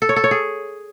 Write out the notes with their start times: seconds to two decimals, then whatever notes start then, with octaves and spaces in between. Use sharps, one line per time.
0.02 A4
0.09 C#5
0.16 A4
0.24 C#5
0.31 G#4